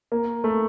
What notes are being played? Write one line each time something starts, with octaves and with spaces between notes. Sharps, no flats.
A#3
A3